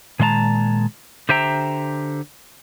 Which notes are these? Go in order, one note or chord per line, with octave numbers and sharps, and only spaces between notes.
A#2 D#3 G#3 D#5 A5 A#5
D3 G4 C5 E5 G5 A#5